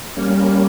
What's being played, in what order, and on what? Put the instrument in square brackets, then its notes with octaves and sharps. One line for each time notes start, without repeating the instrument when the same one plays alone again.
[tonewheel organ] G3 A#3 C#4